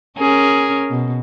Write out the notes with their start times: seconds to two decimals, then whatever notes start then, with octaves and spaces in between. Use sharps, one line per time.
0.18 C#4 G#4 A#4
0.90 B2